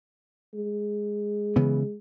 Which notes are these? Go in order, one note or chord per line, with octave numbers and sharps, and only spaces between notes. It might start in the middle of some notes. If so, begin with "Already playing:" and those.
G#3
C#3 E3 B3